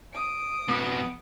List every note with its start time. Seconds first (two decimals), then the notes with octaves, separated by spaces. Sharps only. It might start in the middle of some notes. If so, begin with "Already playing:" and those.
0.13 D#6 D7
0.68 F2 B2 B3